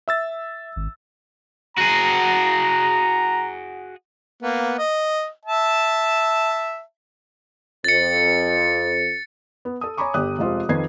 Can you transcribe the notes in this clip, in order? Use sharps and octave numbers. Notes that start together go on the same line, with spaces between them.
E5 E6 A6
G#1
F#4 G#4 A#5
A#3 B3
D#5
E5 A5
F2 A6 C#7
B3
A4 D#6
C#5 G#5 A#5 B5 C#6 D6
G1 G4 D#6 F#6
F1 G#3 F4 G4 C5
F2 D#3 B4 G#6 C7